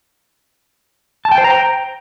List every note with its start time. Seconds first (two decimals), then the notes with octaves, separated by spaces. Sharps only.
1.25 A5
1.31 G5
1.38 C5
1.44 A#5
1.51 G5